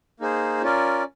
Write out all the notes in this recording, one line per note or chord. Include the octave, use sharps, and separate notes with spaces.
A#3 D#4 G#4 C5
C#4 F4 A#4 D5